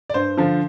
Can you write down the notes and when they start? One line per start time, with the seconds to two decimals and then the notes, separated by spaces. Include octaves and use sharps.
0.10 D5
0.14 G2 C5
0.38 D3 F3